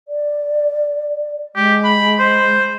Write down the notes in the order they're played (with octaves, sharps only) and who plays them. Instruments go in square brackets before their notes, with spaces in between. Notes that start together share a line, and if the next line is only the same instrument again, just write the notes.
[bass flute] D5
[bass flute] G#3 [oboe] G4
[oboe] B5
C5